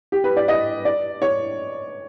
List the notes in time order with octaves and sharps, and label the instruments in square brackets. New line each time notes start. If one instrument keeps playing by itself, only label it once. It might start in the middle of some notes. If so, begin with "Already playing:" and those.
[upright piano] G4
B4
D5
D#5
D5
C#5